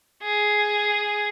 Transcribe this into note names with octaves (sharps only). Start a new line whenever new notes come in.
G#4